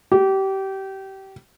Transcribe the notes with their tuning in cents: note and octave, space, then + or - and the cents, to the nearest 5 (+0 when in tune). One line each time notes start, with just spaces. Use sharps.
G4 -25